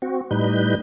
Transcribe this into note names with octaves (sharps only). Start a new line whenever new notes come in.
C4 F#4
A2 G3 D#4 B4 G6